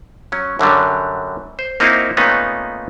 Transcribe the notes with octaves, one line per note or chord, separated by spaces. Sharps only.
F#3 C#4
F#2 D3 F#3 G3
C5
A#3 C4 D#4 E4 F#4 F5
A#2 D#3 A3 B3 C#4 D#4